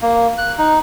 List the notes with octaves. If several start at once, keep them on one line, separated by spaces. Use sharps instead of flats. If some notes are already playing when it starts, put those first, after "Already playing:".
A#3
F#6
D#4